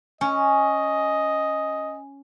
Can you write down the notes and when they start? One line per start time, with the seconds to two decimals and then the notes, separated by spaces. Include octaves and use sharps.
0.21 C#4 D#5 G#5